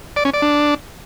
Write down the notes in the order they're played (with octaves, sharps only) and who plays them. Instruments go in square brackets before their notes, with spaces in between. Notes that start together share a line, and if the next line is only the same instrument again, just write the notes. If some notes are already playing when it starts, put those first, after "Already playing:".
[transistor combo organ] D5
C#4
D5
D4